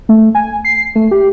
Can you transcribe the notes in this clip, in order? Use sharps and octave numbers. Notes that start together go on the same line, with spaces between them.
A3
G#5
C7
A3
G4